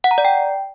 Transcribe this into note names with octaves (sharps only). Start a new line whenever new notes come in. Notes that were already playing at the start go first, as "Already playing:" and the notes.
F#5
A#5
D5
G5